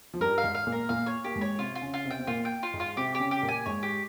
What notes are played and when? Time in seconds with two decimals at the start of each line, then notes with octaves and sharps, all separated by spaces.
0.14 F3
0.21 G2 G3 A#4
0.38 F5
0.44 G#2 G#3
0.55 F5
0.67 A#2 A#3
0.72 A#4
0.89 A#2 A#3 F5
1.06 C#5
1.24 A#3 G4
1.36 G#2 G#3
1.41 C#5
1.58 C3 C4 F4
1.75 F4
1.82 C#3 C#4
1.94 F4
2.05 C3 C4
2.11 G5
2.19 C4
2.27 A#2 A#3 F4
2.45 G5
2.63 F4
2.74 G#2 G#3
2.80 F4
2.96 C3 C4 G4
3.15 G4
3.20 C#3 C#4
3.31 G4
3.43 A#2 A#3
3.49 G#5
3.66 G#2 G#3 C#5
3.83 G4